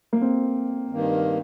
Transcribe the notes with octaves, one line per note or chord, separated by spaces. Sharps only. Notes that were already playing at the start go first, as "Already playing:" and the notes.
A#3
C4
G2 D#3 A#3